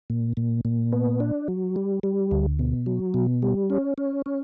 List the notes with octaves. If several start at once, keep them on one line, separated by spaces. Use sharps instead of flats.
A#2
A#2
A#2
B3
D4
F#3
G3
G3
D2
B2
F#3
B2
G3
C#4
C#4
C#4